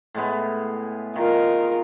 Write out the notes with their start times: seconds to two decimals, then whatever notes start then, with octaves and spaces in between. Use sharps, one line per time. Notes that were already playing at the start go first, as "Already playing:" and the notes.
0.14 A2 G#3 B3
1.16 D#3 F4 A#4